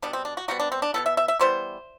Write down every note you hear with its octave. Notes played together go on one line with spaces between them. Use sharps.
B2 G3 B3 D4
C4
D4
F#4
C3 G3 B3 F#4
D4
C4
D4
B2 G3 B3 A4
E5
E5
E5
E3 G3 B3 C5